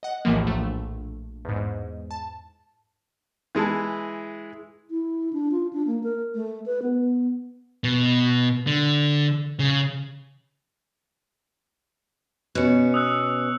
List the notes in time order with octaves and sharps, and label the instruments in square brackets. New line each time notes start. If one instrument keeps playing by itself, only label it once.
[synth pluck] D#5 F#5
A#1 D#2 A2 E3 F3 A#3
A#1 A3
E2 G#2
A5
[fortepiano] E3 G#3 E4 A5
[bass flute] E4
D4
F4
D4
A#3
A#4
A3
B4
B3
[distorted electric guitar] B2
D3
C#3
[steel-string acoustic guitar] B2 C#4 [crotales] F#6 C#7
[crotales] D#6 E6 F#6